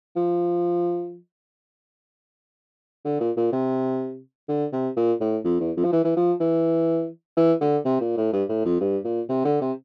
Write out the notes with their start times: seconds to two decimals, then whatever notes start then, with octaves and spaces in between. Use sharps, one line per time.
0.16 F3
3.05 D3
3.20 A#2
3.36 A#2
3.52 C3
4.49 D3
4.72 C3
4.96 A#2
5.21 A2
5.45 F2
5.60 E2
5.77 F2
5.84 F3
5.93 E3
6.04 E3
6.16 F3
6.40 E3
7.37 E3
7.61 D3
7.85 C3
8.01 A#2
8.17 A2
8.33 G2
8.49 A2
8.65 F2
8.80 G2
9.05 A#2
9.29 C3
9.45 D3
9.61 C3